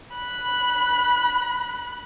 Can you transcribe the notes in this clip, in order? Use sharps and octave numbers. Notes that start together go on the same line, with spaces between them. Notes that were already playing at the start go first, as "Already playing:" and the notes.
B5 F#6